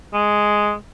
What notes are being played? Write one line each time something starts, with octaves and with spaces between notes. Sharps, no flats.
G#3